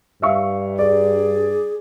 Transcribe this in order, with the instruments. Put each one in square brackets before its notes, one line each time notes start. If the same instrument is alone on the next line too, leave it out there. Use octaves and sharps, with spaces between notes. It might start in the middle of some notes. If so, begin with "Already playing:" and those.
[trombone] G2 [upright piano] E5 F5 C#6
[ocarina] G#4 [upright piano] D5